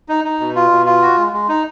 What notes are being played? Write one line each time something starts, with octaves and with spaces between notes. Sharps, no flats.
D#4
D#4
B2
F4
B2
F4
F#4
G#3
G#3
D#4